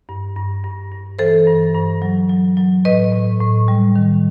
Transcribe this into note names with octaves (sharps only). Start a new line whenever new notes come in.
G2
G2
G2
G2
E3 A4 C5
G2
G2
F#3
F#3
F#3
A2 B4 D#5
A2
A2
G3
D#3